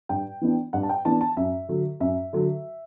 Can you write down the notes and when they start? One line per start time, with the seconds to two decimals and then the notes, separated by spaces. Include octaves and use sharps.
0.09 G2 G5
0.41 E3 B3 D4
0.73 G2 F#5
0.83 A5
0.89 G5
1.05 E3 B3 D4 A5
1.21 A5
1.37 F#2 E5
1.68 D3 F#3
2.00 F#2 E5
2.33 D3 F#3